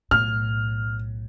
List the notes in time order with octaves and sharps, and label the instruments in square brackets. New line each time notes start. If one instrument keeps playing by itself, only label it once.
[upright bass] B1 A2 [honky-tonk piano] F6